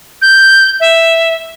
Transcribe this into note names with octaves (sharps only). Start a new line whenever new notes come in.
G6
E5